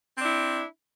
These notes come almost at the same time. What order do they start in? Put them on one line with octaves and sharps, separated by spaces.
C4 D4 E4